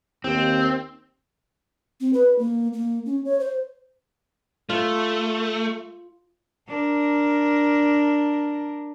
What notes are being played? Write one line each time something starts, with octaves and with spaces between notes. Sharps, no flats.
D#2 C4
C4
B4
A#3
A#3
C#4
C#5
C5
A3 F4
D4 A#4